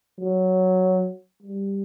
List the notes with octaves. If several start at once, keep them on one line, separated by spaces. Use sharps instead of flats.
F#3
G3